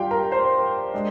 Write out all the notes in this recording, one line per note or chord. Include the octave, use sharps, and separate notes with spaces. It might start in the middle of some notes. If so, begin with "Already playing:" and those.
Already playing: G3 D4 F4 G4 F5 G5
A#4 A#5
C5 C6
G#3 D4